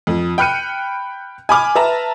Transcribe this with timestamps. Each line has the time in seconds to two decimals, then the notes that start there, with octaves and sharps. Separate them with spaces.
0.07 F2
0.38 G5 B5 F6 F#6 C#7 D#7
1.49 G#5 B5 D6 F6
1.75 B4 E5 A5 A#5